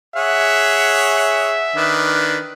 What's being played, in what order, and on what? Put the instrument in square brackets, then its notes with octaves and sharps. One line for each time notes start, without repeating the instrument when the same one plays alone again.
[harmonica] G#4 C#5 F#5 [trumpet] E5
[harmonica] D#3 D4 B4